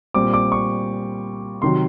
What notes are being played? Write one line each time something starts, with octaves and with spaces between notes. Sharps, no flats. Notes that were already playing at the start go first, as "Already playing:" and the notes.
A#2 G3 C4 D6
D6
C#6
C3 D#3 F#3 C6